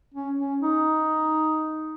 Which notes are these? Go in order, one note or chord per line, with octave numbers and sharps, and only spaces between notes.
C#4
C#4
D#4